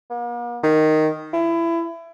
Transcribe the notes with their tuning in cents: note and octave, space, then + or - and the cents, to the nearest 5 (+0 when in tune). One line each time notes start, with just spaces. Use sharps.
A#3 +45
D#3 -5
E4 +25